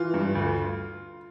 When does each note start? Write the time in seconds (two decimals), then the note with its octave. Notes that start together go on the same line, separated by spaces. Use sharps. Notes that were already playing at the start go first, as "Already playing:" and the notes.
Already playing: E3 F4
0.14 G2
0.35 D2